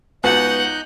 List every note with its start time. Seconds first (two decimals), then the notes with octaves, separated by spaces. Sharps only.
0.24 C#2 B3 D#4 F#4 F#5 F#6 G6